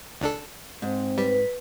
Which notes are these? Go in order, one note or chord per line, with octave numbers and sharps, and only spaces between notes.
C#2 D4 A4
G#2 C4
G3 B4